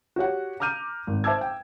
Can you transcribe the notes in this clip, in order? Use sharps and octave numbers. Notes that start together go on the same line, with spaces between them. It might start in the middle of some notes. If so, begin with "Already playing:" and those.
F#4 G4 C#5 F#5
A#5 D6 F6 G6 D#7
G#1
C5 E5 A5 D6 E6 G#6
G5